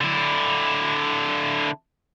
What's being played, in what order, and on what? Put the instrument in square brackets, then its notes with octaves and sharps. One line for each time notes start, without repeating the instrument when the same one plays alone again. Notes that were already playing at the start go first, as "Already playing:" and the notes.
[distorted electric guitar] D3 E4